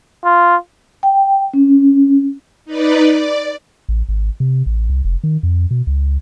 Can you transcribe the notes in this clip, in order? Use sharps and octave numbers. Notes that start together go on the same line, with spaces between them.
F4
G5
C#4
D#4 B4 D5
D5
A1
G#1
C3
A1
C2
F1
D#3
F2
B2
C#2